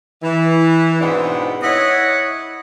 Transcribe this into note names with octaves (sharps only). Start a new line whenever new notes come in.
E3
G#2 B2 B3 C4 D4
E4 C#5 D#5 F#5